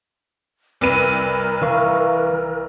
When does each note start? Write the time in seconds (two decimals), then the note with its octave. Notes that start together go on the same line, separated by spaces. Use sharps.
0.81 C2 A#4 B4 D#7
1.62 E3 F5 C#6